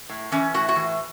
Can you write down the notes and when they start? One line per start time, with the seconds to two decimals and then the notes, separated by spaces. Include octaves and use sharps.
0.09 A2
0.32 E3 C#4
0.54 A2 F#4
0.69 F#4
0.76 E3